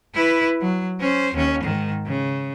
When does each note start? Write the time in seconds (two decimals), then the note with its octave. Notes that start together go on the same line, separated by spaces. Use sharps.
0.14 E4 B4
0.61 F#3
1.00 C#4 C5
1.34 D#2 C#4
1.63 G#2 D#3
2.06 C#3